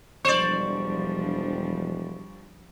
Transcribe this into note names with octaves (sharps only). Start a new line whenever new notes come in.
E1 F3 G3 D4 C5 D5 C#6